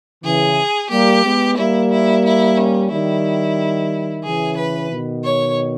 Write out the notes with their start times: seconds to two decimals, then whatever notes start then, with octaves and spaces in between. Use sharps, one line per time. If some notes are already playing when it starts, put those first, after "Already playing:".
0.24 C#3 E3 G#4
0.91 G3 A#3 G4
1.25 G#3 B3
1.57 G3 A#3 E4
1.91 E4
2.25 E4
2.57 C#4
2.91 D#3 G3 E4
4.24 C#3 E3 G#4
4.58 B4
4.91 B2 D#3
5.24 C#5